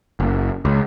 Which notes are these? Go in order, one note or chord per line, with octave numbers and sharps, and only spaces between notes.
F#1
C#2